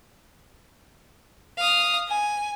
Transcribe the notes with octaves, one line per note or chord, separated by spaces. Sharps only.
F5 D#6
G#5